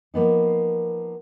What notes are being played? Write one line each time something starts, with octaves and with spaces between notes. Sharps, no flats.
F3 A#3 B3 D#4